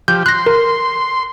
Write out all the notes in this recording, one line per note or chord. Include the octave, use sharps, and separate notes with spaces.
F3 G4 G6
C6 F#6 A#6
A#4